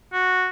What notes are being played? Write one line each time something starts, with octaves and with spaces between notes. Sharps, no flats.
F#4